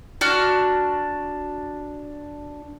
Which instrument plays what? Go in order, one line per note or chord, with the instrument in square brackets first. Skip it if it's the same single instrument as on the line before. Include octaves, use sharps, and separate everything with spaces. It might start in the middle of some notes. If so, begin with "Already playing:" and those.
[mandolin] D4 F#4 F6